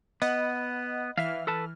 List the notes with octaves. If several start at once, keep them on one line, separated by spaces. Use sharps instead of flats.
B3 D#5 F#5 B5
E3 E5 F5 F6
A4 B4 A5